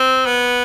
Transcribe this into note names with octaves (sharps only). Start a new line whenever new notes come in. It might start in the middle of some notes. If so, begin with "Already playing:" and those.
Already playing: C4
B3